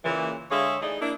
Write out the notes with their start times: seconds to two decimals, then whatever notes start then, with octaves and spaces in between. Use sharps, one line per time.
0.04 A#2 C#3 E3
0.51 D3 G#3 G#4 C#5 E5 F5
0.81 E3 A3 D#4 G#4 D5 D#5
1.01 A#3 D4 E4